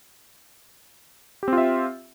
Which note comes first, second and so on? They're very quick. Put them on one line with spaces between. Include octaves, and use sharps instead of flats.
G4 C4 F4 E5